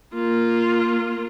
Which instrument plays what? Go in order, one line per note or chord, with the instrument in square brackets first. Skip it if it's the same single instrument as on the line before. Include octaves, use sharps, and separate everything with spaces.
[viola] A#3 F4